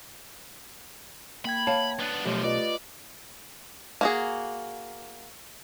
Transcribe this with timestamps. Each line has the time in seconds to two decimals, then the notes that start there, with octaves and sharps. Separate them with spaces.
1.45 A#3 G5 B5 G#6
1.67 C#5 F5 A5
2.00 B3 D4
2.26 B1 F#2 F3 A3 G4
2.44 F4 B4 D5 D#5
4.01 A#3 F#4 G#4